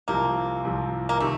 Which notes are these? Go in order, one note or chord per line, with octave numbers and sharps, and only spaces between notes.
C2 C3 F3 A#3
C2 C3 F3
A#3
C3 D#3 A3